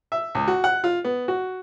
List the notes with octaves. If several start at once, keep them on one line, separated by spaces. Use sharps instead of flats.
E5
C#2
F#4
F#5
F4
B3
F#4